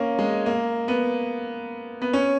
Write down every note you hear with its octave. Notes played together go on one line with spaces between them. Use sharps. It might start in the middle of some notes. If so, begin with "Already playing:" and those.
Already playing: A#3 C#4
G#3
A#3
B3
B3
C#4